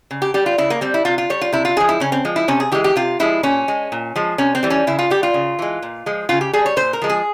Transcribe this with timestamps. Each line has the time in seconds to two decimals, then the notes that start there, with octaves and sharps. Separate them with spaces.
0.11 C#3
0.22 G4
0.34 G3 G4
0.46 F4
0.58 C#3 E4
0.70 A#3
0.81 G3 C4
0.94 E4
1.05 C3 F4
1.18 F4
1.30 G3 C#5
1.41 F4
1.52 C3 E4
1.65 F4
1.76 F3 G#3 G#4
1.89 E4
2.00 C#3 C#4
2.12 C4
2.25 F3 G#3
2.36 E4
2.48 C3 C#4
2.60 G#4
2.72 E3 G#3 G4
2.84 G4
2.96 C3 F4
3.20 F3 G#3 E4
3.43 A#2 C#4
3.68 G#3
3.92 A#2
4.16 F3 G#3
4.38 C3 C#4
4.55 C4
4.63 E3 G3
4.70 C#4
4.87 C#3 E4
4.99 F4
5.10 G3 G4
5.23 F4
5.34 C#3
5.59 E3 G#3
5.82 A#2
6.06 F3 G#3
6.29 C#3 F4
6.41 G4
6.53 G3 G#4
6.66 C#5
6.76 A#2 C5
6.93 A#4
7.02 F3 G#3
7.10 G#4